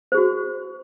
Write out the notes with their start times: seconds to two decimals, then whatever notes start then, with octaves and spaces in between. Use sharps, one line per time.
0.12 C5
0.15 G#4
0.17 F#4